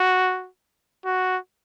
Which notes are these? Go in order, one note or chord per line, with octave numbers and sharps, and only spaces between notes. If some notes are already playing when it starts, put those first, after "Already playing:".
Already playing: F#4
F#4